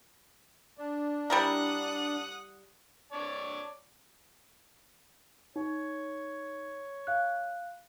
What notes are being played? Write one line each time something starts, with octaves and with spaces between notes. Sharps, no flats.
D4
G3 E4 A#4 F#5 D#6 F#6
C#5 D5 A5
D#4 C#5
F5 F#6